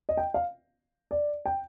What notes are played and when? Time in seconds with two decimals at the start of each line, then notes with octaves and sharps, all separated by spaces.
0.09 D#5
0.17 G5
0.34 F5
1.11 D5
1.46 G5